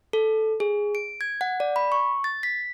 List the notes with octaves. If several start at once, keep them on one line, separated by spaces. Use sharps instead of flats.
A4
G#4
D7
G#6
F#5
D5
B5
C#6
A6
B6